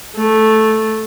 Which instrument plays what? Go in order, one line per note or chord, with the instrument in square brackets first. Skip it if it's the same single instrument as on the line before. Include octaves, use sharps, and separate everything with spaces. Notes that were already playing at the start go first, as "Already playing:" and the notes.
[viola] A3